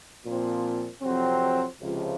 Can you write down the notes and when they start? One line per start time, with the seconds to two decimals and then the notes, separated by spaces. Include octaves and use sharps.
0.24 A#2 F3 C4
1.02 F2 C3 F#3 C4
1.79 C#2 C3 F3